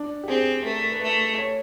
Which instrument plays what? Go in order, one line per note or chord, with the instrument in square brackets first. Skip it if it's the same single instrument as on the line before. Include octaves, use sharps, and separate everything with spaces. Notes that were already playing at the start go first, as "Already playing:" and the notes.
Already playing: [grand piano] D4
G4
[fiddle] C4 [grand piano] G#4
[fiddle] A3 [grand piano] A#4
[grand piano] B4
[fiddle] A3
[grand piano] C#5